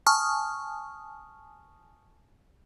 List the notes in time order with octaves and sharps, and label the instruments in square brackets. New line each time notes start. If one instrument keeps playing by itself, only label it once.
[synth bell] G#5 A5 C#6 D#6 F6